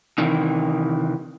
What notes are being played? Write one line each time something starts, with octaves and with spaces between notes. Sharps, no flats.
C3 D#3 E3